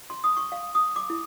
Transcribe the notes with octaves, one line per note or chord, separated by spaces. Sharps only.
C6
D#6
C#6
F5
D#6
D6
E4